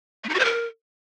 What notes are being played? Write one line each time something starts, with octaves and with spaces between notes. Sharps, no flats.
A3
D#4
F#4
C5
A#4